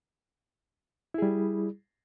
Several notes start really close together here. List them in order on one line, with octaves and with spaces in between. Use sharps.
E4 G#4 G3